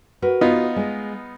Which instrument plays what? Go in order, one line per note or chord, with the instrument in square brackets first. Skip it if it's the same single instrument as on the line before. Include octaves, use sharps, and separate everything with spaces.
[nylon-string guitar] F#4 A#4 B4
[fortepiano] B3 D#4 F4
[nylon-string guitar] G#3